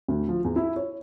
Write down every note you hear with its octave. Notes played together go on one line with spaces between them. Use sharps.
D2
F3
E2
E4
C#5